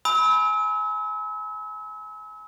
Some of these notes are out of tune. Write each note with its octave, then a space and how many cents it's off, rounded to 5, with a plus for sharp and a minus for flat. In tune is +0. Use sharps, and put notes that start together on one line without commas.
G#5 +20 B5 +0 E6 -40